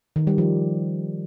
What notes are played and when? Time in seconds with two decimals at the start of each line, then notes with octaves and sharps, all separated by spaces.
0.16 D#3
0.27 G3
0.38 F3